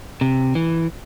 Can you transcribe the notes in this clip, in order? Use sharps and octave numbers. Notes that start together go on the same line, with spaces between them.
C3
E3